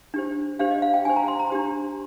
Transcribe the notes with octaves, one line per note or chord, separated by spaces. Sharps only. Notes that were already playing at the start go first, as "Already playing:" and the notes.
D4 G4 C5
D4 G4 C5 F5
D#5
F5
G5
D4 G4 C5 G#5
A#5
C6
A#5
D4 G4 C5